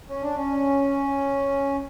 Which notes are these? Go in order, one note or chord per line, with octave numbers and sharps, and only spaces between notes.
C#4
D4
C#4